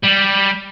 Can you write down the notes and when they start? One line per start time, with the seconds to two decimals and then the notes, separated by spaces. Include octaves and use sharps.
0.03 G3